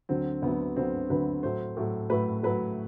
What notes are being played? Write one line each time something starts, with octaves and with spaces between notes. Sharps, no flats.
D2 D3 F#3 C4
D2 D3 F#3 B3
D2 D3 F#3 C4
D2 D3 F#3 B4
A2 F#3 A3 C5
A2 F#3 A3
A2 F#3 A3 B4
A2 F#3 A3 B4